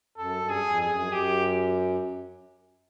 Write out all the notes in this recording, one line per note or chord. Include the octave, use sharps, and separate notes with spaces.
F#2 A4
G2
G#4
F2
G#4
F#2
F#2 G4